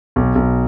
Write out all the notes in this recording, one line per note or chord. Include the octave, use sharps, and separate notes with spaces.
B1
B1